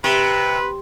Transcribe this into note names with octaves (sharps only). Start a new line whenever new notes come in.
C3 B4